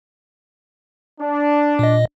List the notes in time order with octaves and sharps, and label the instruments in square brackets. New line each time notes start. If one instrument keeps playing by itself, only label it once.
[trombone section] D4
[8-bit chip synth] A#2 D#5